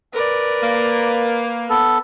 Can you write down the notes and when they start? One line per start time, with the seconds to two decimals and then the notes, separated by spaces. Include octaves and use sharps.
0.14 A#4 B4 D5
0.63 A#3
1.70 B3 A4